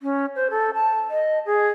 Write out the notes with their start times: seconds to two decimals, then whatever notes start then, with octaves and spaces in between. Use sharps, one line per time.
0.02 C#4
0.36 C5
0.50 A4
0.74 A5
1.10 D#5
1.46 G#4